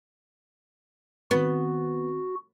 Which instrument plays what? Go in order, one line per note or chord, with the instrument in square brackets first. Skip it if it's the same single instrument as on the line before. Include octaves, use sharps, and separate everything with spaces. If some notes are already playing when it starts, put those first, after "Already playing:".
[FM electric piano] D#3 C4 [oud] B3 [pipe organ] F#4